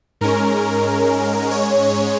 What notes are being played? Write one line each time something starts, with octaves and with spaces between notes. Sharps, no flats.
G#2 G#3 C#4 A#4
C#5